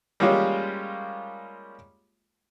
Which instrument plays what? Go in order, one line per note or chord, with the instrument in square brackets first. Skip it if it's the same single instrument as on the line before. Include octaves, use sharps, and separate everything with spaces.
[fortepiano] G3 G#3 A#3 C#4 F4 G4